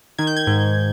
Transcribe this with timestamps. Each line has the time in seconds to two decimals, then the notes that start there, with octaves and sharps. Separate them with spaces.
0.18 D#3 G#6
0.27 G6
0.36 G#6
0.47 G#2